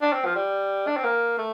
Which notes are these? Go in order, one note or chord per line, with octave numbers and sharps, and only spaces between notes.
D4
C4
F3
G3
D4
C4
A#3
A3